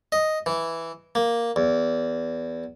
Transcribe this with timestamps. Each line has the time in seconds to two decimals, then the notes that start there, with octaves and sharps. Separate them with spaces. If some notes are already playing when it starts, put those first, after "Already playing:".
0.12 D#5
0.46 E3
1.15 A#3
1.56 E2